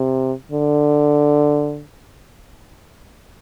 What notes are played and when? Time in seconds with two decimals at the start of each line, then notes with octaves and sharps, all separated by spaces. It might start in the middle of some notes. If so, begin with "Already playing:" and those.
Already playing: C3
0.52 D3